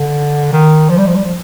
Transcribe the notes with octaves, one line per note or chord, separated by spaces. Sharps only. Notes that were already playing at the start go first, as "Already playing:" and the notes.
Already playing: D3
D#3
F3
G3
F3
G3
F3